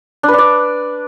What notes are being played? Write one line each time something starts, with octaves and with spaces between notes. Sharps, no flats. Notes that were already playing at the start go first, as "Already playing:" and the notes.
D4
B4
D4
D5